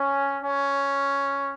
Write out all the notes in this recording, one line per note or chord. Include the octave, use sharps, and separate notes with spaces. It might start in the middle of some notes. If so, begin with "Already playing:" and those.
Already playing: C#4
C#4